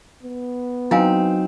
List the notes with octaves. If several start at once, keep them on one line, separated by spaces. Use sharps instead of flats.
B3
F#3 C4 D#4 E4 F5 G#5